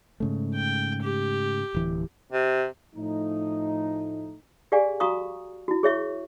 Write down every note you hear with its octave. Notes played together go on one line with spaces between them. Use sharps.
G#2 C#3 A3
G5
G4
D1 E3
C3
A2 F3 A3 D#4
G4 G#4 D5 F5 G#5
F#4 F5 A#5 C#6 D#6
E4 F#4
G#4 C#5 E5 C#6